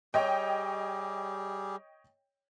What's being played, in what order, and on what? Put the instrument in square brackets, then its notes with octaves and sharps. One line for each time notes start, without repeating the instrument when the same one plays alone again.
[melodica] G3 G4 G#4 [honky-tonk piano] C#5 D#5 G5